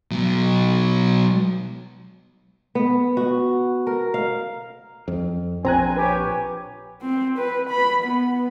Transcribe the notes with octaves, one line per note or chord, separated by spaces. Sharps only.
B2 F#3
B3
F#4
A#4
F5
F2
A#1 C4 G#5 A#5 F#6
G4 B4 C#5 G#5
C4
B4
B5
B3